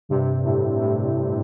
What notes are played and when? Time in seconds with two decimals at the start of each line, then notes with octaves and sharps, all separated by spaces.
0.09 G2 C3
0.44 A2
0.80 A2